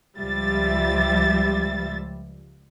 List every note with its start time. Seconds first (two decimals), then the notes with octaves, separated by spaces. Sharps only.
0.18 C#2 F3 G3 E5 A6